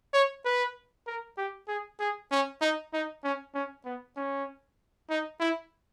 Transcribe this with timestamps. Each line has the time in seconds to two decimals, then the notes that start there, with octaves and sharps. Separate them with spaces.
0.14 C#5
0.45 B4
1.07 A#4
1.38 G4
1.68 G#4
2.00 G#4
2.31 C#4
2.61 D#4
2.93 D#4
3.23 C#4
3.54 C#4
3.85 B3
4.16 C#4
5.10 D#4
5.40 E4